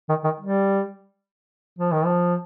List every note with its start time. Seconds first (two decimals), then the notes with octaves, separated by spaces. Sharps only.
0.09 D#3
0.24 D#3
0.40 G3
1.79 F3
1.92 D#3
2.05 F3